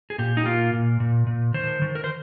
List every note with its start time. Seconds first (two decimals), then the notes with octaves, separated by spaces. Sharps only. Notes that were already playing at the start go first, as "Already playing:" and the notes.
0.10 G#4
0.18 A#2 G4
0.37 D#4
0.45 A#3 F4
0.73 A#2
1.00 A#2
1.27 A#2
1.54 D#3 C5
1.82 D#3
1.95 A#4
2.04 C5